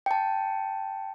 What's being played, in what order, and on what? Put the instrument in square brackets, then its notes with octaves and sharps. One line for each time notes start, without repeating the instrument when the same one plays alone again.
[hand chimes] G5 A5